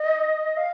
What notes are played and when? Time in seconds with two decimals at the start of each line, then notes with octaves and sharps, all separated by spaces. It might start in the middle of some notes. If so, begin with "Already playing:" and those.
Already playing: D#5
0.57 F5